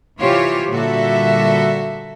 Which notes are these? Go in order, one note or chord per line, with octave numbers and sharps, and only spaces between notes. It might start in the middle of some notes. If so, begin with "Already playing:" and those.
C3 E3 F4 G4 C5 C#5
A#2 D3 G3 F#4 A4 E5